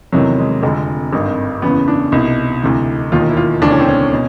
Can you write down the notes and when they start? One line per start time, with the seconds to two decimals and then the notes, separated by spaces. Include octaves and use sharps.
0.12 F1 E2 C3 D#3 F#3
0.38 G#3
0.62 F1 F2 D3 G#3
1.13 G#1 G2 D#3
1.62 F#1 E2 C#3 B3
1.88 D4
2.12 C2 B2 D#4
2.62 D2 C3 E3
3.12 E1 D#2 D#3 F4
3.20 D#4
3.29 E4
3.37 F4
3.62 E1 D2 C#3 E3 D4
3.71 C#4
3.80 C4
3.88 C#4
4.13 B2